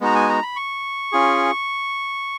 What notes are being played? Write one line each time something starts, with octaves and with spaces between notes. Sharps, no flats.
G#3 B3 D#4 F#4 A#5
G#5
A#5
B5
C#6
C#4 F4 G#4